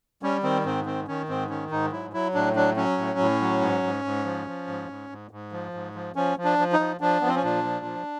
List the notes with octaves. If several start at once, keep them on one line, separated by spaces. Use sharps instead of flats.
G3 C#4
D#3 C4
G#2 C4
D#3 C4
D#3 C#4
G#2 C4
D#3 C#4
G#2 D#4
F#3 E4
F#3 E4
A2 D4
F#3 D4
F#3 C#4
A2
A2
F#3
G#2
G#2
G#2
F3
F3
G#2
G#2
G#2
G#2
F3
G#2
F3
F3 C#4
F3
D4
F3
D#4
F3
F3 D4
F3 B3
C4
C#4
A#2 D4
F3
F3